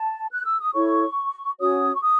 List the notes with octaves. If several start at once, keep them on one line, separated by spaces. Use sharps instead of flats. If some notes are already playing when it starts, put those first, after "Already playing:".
Already playing: A5
F#6
E6
D#6
E4 A4 C#5 C#6
C#4 F#4 C#5 D#6
C#6
D#6